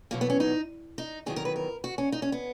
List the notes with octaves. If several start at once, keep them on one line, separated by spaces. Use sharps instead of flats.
E2 B2 F#3 A#3
B3
C#4
D#4
D#4
E2 D#3 F#3 G#4
A#4
B4
A#4
F#4
C#4
D#4
C#4
B3